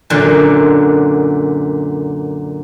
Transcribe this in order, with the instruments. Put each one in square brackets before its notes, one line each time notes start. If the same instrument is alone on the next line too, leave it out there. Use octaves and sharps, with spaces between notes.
[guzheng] F#2 A#2 D3